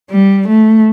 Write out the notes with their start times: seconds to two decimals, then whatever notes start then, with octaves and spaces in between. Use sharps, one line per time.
0.10 G3
0.48 A3